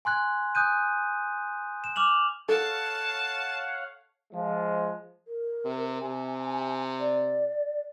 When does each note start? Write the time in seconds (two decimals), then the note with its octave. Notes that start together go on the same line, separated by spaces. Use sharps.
0.05 G#5 C6 F#6 G#6
0.55 G#5 D#6 F#6 G6 D#7
1.84 E7
1.96 D6 F6 F7 F#7
2.49 A4 C#5 F5 F#5 A5
4.32 F3 G#3
5.27 A#4
5.65 C3
6.01 C3 G#5
6.99 D5